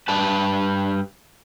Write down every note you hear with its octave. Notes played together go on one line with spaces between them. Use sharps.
G2 B4 A5